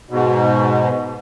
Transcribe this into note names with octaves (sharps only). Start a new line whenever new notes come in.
G#2 B2